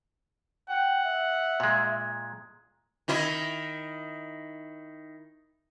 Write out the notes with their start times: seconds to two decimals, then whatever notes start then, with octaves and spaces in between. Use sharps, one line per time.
0.69 F#5 G5
1.05 E5
1.60 A#2 G#3
3.08 D#3 E4 D#5